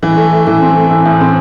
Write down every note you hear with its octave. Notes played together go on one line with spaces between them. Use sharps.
E3
A3
A3
E3
C4
A3
E3
A2
C4